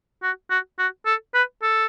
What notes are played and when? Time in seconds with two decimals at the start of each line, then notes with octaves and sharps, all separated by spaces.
0.23 F#4
0.50 F#4
0.79 F#4
1.06 A4
1.34 B4
1.63 A4